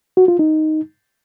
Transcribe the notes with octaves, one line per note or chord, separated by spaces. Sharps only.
F#4
F4
D#4